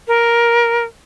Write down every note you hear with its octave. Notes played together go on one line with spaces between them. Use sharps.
A#4